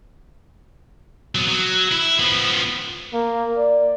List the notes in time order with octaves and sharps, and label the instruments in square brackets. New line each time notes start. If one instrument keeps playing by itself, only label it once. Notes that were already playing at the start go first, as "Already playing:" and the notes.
[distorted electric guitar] F#3 B3
F#3
E4
F3 B3
[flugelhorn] A#3
D5